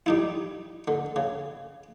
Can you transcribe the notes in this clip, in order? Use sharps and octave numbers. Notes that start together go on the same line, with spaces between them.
G3 D#4 E4
D3
C#3